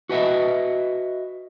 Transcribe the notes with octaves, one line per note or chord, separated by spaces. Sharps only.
F#4 B4 D#5 E5